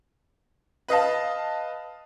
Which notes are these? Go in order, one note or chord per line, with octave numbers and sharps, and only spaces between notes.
B4 D#5 F5 A5